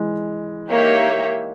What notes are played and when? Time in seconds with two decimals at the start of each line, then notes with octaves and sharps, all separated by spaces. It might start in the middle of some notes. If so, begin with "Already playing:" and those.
Already playing: E3 G#3
0.69 A#3 D#4 G4 C#5 E5